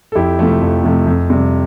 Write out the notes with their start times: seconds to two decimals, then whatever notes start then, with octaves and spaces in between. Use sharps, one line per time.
0.12 A4
0.15 F2 E4 G4
0.39 C3 F3 A3
0.61 F2
0.84 C3 F3 A3
1.07 F2
1.30 C3 G3